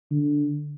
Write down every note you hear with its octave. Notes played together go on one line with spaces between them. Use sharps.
D3